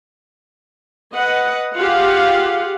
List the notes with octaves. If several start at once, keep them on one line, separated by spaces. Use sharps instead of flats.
B4 D#5 F#5
F4 G4 G#4 F5 F#5